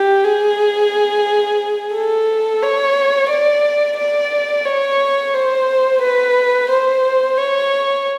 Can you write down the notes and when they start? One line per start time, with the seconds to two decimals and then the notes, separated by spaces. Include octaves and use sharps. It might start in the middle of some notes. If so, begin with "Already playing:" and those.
Already playing: G4
0.24 G#4
1.94 A4
2.62 C#5
3.29 D5
3.98 D5
4.65 C#5
5.34 C5
6.01 B4
6.70 C5
7.37 C#5